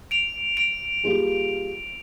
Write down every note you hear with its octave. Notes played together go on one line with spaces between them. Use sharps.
D7 F7
D7 F7
G3 A#3 F4 G#4